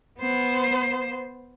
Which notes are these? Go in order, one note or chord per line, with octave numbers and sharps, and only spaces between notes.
B3 C5